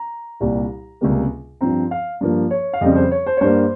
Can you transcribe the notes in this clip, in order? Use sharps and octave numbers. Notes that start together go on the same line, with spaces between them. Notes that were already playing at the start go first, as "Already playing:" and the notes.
Already playing: A#5
C2 A#2 G3
C#2 C3 G3 A#3
G2 F3 C4 A#5
F5
G2 F3 A#3
C#5
F5
F2 C#3 G3 C4 D#5
C5
C#5
C5
C#5
G2 G3 A#3 C5